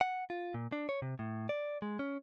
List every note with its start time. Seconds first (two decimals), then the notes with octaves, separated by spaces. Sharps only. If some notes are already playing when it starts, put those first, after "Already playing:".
0.01 F#5
0.30 F4
0.54 A#2
0.72 D4
0.89 C#5
1.02 C3
1.19 A2
1.49 D5
1.82 G#3
1.99 C#4